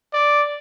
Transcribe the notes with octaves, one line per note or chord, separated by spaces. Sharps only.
D5